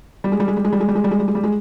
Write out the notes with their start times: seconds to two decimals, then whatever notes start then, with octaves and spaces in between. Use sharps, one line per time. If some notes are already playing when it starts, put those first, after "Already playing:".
0.24 G3
0.32 G#3
0.40 G3
0.48 G#3
0.57 G3
0.65 G#3
0.72 G3
0.80 G#3
0.88 G3
0.95 G#3
1.04 G3
1.11 G#3
1.19 G3
1.28 G#3
1.35 G3
1.44 G#3